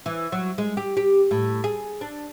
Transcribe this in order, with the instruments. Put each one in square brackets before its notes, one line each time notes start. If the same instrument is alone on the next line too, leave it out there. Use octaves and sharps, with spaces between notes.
[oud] E3
F#3
G#3
G4
G4
A2
G#4
D4